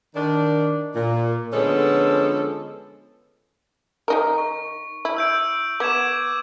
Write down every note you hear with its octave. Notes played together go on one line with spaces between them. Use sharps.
D#3 D4
A#2
D3 F3 G#3 B3 C#4 A4
D#3 D#4 A#4
C#6
E4
E6 G6 D7
B3 D6 G#6 E7